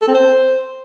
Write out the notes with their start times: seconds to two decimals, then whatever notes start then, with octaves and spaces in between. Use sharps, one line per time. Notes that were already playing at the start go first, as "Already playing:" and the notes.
0.02 A4
0.08 C4
0.14 C5